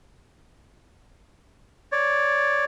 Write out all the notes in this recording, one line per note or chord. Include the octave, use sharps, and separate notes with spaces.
C#5 D5